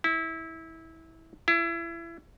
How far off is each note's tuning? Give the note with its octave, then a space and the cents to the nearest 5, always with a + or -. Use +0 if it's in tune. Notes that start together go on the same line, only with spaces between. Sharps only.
E4 -20
E4 +30